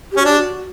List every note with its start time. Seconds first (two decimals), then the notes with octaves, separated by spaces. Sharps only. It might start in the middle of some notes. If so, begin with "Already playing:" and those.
0.12 G4
0.17 C#4 F#4
0.25 D4 G4
0.39 F#4